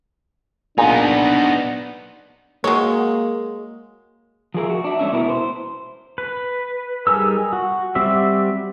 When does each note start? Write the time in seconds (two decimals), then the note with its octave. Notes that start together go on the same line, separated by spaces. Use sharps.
0.78 A#2 B3 D4 D#4 G#4
2.64 F#3 G#3 A#3 C#5
4.54 F3 F4 G#4 A#4 E5
4.70 F#4
4.84 D4 E5
4.99 G#3 A3 C#4 E5
5.12 E2 B2 E3 B3 E4 A#4
5.29 C5
6.18 B4
7.07 G3 D#4 G#4 A#4 E6
7.53 F#4
7.95 G3 C4 F#4 G4 E5